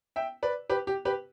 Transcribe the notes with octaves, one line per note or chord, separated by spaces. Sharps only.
E5 G5
B4 D5
G4 B4
G4
G4 B4